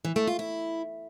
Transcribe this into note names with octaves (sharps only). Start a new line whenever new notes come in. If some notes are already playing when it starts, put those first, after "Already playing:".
E3
A3
F4
E4